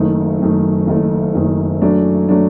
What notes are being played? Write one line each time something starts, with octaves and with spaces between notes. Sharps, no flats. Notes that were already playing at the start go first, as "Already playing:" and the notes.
Already playing: F#1 F#2 D#3 A3
F#1 F#2 D#3 A3
F#1 F#2 D#3 A3
F#1 F#2 D#3 A3
F#2 F#3 A3 D4
F#3 A3 D4